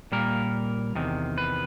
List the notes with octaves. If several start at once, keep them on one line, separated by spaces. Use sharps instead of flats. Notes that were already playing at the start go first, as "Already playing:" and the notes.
A#2 G3 A#3 A#4
E2 C3 D#3
B4